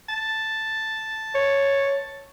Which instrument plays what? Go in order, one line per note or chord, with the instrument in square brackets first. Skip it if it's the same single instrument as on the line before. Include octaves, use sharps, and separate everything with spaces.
[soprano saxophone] A5
[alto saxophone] C#5